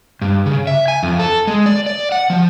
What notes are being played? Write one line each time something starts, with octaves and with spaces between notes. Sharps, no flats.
G2
C#3
E5
G#5
F2
A4
G#3
D5
D5
F#5
F3